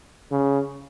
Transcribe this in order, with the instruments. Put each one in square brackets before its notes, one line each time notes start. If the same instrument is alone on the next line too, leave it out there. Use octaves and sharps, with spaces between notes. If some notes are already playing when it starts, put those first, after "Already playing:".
[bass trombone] C#3